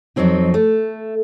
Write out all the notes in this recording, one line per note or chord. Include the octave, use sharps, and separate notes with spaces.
F2 A#2 F3 F#3 C4 D#4
A3